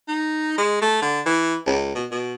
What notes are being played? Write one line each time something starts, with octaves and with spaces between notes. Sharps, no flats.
D#4
G#3
A3
D3
E3
C#2
B2
B2